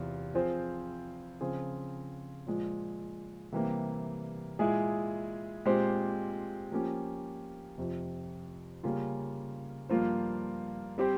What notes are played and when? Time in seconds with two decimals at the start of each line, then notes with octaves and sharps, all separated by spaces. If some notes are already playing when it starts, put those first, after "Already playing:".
Already playing: E2 C3 F4
0.34 F3 C4 F4 G#4 C5
1.41 C#3 F3 C4 F4 G#4
2.47 A#2 F3 G#3
3.52 C3 E3 G3 A#3
4.59 A#2 G#3 E4 G#4
5.65 A#2 G#3 C4 G4 C5
6.72 F3 A#3 C#4 G4
7.78 F2 C3 F3
8.83 C#3 G3 A#3 C#4 F4
9.89 G2 F3 A#3 F4 C5
10.98 G3 C4 G4 C5